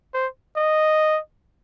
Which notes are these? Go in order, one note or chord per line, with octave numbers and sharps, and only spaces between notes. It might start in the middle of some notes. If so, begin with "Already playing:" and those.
C5
D#5